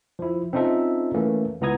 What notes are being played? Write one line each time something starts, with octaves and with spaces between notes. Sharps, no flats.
F3 E4
C4 C#4 D#4 F4 A4 E5
E3 A3 A#3 C#4
C#2 B3 E4 A#5 D#6 G#6